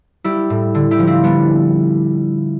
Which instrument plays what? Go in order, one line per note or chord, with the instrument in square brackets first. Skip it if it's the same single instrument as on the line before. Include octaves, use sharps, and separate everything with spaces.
[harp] G3 E4 G4
A2
D3
E4 G4
F3
C4 E4
G3 B3 D4